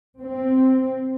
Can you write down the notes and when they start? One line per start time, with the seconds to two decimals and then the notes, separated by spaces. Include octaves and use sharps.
0.18 C4